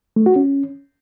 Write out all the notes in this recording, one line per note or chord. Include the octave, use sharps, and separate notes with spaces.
A3
F#4
C#4